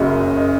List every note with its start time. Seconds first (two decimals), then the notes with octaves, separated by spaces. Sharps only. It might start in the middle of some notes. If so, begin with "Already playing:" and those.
Already playing: F#1 F#2 C#3 D#5
0.37 D#5